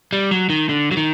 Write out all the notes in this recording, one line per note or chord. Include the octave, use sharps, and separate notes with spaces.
G3
F#3
D#3
D3
F#3
D#3